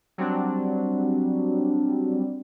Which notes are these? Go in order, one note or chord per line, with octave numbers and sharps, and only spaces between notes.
F#3 G3 C4 D4